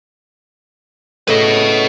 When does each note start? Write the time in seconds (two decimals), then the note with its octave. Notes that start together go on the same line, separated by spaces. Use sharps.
1.28 A2 C#3 B4 D#5